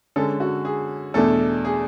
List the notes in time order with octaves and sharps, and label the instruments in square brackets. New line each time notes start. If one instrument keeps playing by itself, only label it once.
[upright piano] D3 G#3 C#4 A4
F#4
G#4
E2 B2 A3 D4 A4
G#4